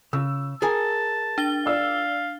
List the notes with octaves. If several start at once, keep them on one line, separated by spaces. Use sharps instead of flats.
C#3 E6
G#4 A#4 G#5 A5
D4 A6 G7
D5 F5 E6